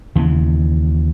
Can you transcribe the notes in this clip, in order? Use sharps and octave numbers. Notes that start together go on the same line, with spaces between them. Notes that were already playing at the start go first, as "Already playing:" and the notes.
D#2 C#3 E3